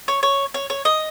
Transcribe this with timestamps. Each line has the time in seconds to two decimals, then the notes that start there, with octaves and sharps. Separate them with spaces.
0.08 C#5
0.23 C#5
0.54 C#5
0.70 C#5
0.85 D#5